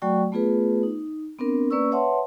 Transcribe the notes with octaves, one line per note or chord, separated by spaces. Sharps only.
F#3 A3 F#4 D5 G5 C#6
A3 B3 F4 G#4 B4
D#4
B3 C4 D4 A#4
A#3 C#4 B4 D5 C#6 E6
B4 C#5 E5 F#5 A5 C6